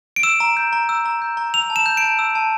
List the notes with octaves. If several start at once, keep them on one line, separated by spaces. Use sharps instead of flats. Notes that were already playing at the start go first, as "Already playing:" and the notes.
D7
E6 E7
A#5
G6
A#5
E6
A#5
G6
A#5
E6 F7
A5
E7
G6
D7
A5
E6
A5